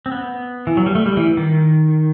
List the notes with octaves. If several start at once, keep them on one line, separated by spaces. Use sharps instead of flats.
C4
B3
E3
F#3
G3
A3
G3
E3
D#3